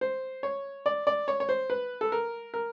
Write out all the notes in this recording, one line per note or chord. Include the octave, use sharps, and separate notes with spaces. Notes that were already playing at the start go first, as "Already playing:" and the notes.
C5
C#5
D5
D5
C#5
C#5
C5
B4
A4
A#4
A#4